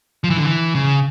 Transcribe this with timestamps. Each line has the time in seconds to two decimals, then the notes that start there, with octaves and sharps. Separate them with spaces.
0.24 F3
0.30 E3
0.37 D3
0.45 E3
0.75 C#3